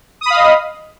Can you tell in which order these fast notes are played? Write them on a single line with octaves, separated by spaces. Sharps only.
D#6 B5 F5 D#5